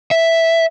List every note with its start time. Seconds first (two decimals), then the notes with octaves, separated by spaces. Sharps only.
0.11 E5